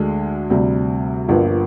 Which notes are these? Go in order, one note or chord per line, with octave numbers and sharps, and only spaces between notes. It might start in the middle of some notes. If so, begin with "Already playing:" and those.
Already playing: D2 D3 G#3
D2 C3 G3
G1 G2 F3 A#3